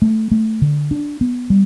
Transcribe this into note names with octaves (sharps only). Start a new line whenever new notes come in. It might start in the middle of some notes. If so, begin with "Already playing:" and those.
A3
A3
D3
D4
B3
G3